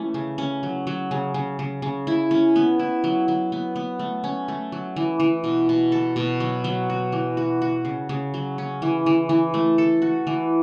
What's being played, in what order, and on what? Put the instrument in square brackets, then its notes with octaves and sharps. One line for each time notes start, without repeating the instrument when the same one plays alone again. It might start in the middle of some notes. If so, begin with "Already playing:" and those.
Already playing: [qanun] E3 A3 C#4
C#3
C#4
F#3
F#3
C#3
C#3
C#3
C#3
E4
C#4
B3
E4
F#3
F#3
B3
B3
A3
C#4
A3
F#3
E3
E3
B2
B2
A4
B2
F#3
F#3
F#4
E3
F#4
F#4
C#3
C#3
F#3
C#4
E3
E3
E3
A3
A4
F#4
E3